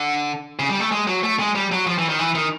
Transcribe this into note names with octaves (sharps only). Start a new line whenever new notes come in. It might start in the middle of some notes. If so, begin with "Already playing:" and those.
Already playing: D3
C#3
G3
A3
G#3
F#3
A3
G#3
G3
F#3
F3
E3
D#3
E3
D#3